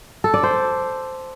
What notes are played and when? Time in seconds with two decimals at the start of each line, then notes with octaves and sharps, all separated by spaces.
0.24 A4
0.34 D5
0.43 C5